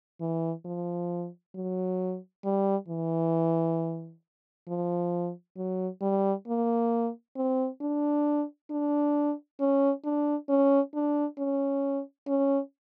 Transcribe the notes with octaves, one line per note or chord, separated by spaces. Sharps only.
E3
F3
F#3
G3
E3
F3
F#3
G3
A#3
C4
D4
D4
C#4
D4
C#4
D4
C#4
C#4